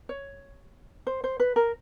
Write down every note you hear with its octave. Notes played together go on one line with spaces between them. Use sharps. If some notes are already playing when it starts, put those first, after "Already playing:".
C#5
C5
C5
B4
A#4